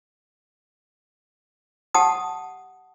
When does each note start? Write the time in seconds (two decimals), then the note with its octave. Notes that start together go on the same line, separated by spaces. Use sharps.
1.95 G4 F#5 A5 D#6